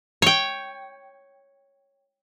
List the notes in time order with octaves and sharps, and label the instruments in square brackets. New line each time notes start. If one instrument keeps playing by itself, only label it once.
[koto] C#5 G5